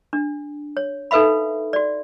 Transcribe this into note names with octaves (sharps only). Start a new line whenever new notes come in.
D4
C#5
D#4 A4 B4 E5 F5 B5
F#4 D5